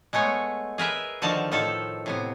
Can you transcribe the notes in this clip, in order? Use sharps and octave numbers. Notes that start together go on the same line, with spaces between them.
G#3 A3 B3 C#5
G#4 A#4 B4 E5
D3 D#3 F3 F#4 F5 A5
A2 D#3 F3 A4
A2 C3 B3